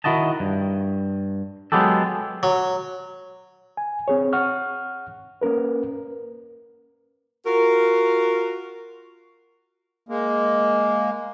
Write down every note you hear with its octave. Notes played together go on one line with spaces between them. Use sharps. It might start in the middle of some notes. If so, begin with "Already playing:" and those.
D#3 E4 F#4 D#5 A5
G2
F#3 G#3 B3 G4 A4
F#3
G#5
C4 G#4 C#5
F#5 C#6 F6
A#3 C#4 A#4 B4
F4 F#4 A#4
G#3 A#3